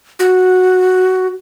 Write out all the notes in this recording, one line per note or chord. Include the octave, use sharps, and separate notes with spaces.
F#4